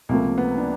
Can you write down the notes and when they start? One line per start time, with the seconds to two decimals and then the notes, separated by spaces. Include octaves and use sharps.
0.09 C#2 C3 F3 A3 A#3 C4
0.38 B3
0.58 D4